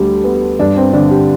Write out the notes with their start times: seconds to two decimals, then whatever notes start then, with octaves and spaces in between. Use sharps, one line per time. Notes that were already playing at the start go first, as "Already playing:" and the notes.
Already playing: D2 D3 G3 A3
0.24 B3
0.59 G2 D4
0.77 C4
0.93 D3 D4
1.11 G4